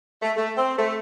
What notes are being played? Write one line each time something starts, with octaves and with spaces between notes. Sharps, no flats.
A3
A3
C4
A3